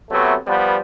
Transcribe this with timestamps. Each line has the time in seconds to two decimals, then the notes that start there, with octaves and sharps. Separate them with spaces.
0.11 C3 F#3 A3 B3
0.48 F3 G3 B3